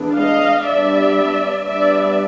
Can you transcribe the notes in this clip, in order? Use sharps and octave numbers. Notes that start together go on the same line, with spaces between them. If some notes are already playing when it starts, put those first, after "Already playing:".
Already playing: E3 G#3 B3 D4
D#5 F5
G3 B3 D4 D5 E5
G3 B3 D4 D5 E5